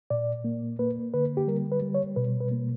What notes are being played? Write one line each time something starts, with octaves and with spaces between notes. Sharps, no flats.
A#2 D5
A#3
A#3 B4
D3 B4
G4
G3 A#4
B4
G3
C#5
B2 B4
B4
A#3